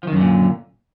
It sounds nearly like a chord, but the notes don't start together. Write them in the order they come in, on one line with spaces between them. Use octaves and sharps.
F3 D#3 F#2 D3 A#2